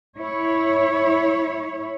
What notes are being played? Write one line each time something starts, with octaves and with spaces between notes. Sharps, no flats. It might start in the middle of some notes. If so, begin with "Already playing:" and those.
E4 C#5